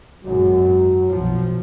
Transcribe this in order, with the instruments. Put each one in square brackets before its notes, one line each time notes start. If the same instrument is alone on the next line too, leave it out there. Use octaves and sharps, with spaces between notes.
[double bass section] G#1 F#2 [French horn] F#3
[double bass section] B1 F3